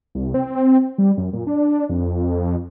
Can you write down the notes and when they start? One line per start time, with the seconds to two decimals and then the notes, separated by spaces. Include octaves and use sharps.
0.15 C2
0.34 C4
0.98 G3
1.18 F#2
1.33 A#2
1.47 D4
1.89 F2